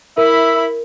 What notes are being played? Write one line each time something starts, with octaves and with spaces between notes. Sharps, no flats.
E4 A#4 E5 B5